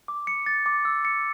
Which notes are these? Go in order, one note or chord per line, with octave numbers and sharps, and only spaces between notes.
D6
C#7
A6
D6
E6
C#7